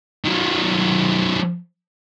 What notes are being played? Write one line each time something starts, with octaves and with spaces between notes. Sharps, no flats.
D#3 F#3